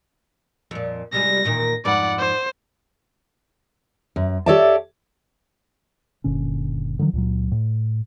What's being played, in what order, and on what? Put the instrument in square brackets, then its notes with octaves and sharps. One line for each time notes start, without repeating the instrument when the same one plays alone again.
[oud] F2 A#2
[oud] C3 G3 G#3 [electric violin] A#6
[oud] E2 A#2 D#3
[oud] F2 G#2 B4 [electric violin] D5 F#5
[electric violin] C5
[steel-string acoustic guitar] F#2
G4 A4 C#5 D5 E5 A5
[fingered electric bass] F#1 A#2 D3 C#4
D3 D#3 F3 F#3
C#2 A#2 F#3
A2